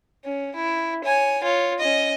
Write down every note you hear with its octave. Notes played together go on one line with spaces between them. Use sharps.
C#4
E4
C#5 G#5
F4 C#5
C#4 D#5